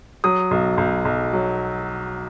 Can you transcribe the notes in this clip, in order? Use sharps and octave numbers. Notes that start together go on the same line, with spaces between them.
F#3 D#6
B1
B1
B1
F#3